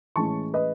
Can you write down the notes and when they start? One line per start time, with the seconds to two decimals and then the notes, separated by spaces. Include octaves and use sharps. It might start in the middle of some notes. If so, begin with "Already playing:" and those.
0.16 A2 E3 G#3 C#4 A5 C#6
0.54 B4 D#5